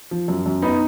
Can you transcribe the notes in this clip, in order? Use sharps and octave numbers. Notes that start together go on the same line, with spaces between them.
F3
F#2
F#2
B3 D#4